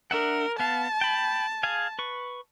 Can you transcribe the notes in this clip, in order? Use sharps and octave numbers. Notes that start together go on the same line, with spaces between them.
D4 A#4 E5 F#5
B3 F5 A5
G5 B5
G#4 F5 G#5
B4 C#6